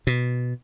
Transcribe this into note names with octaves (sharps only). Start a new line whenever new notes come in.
B2